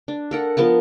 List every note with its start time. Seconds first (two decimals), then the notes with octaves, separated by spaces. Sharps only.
0.08 D4
0.31 A4 A#4 F#5
0.57 F3 B3 A#4 A5